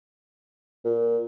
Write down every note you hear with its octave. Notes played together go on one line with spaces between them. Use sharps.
A#2